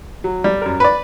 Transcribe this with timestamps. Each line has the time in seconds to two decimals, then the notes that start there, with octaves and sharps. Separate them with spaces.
0.24 F#3
0.44 G3
0.62 F#2 A#4
0.80 B4 D5 B5